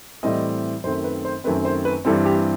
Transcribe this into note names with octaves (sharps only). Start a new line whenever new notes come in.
A2 E3 G3 C4 D#5
F#2 D#3 A3 C4 C5
B4
C5
F#2 D#3 A3 C4 B4
C5
B4
G2 E3 G3 C4 A4
G4